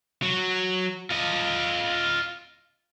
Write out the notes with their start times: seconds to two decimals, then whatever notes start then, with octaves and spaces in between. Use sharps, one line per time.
0.22 F#3 F#4
1.10 F4 D#5